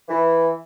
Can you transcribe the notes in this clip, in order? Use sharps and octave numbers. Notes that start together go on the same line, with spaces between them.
E3